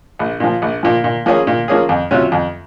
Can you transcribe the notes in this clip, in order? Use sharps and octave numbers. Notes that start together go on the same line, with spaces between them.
A#1
A#2 F3
A#1
A#2 F3
A#2
F3 A#3 C#4 G#4
A#2
F3 A#3 C#4 G#4
F2
C3 F#3 C#4 F4
F2